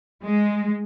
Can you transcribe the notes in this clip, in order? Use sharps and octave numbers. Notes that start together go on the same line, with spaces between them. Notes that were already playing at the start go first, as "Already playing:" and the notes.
G#3